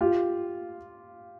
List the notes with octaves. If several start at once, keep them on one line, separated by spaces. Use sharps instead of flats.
F4 G4